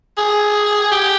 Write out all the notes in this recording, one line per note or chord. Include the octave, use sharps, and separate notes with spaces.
G#4
G4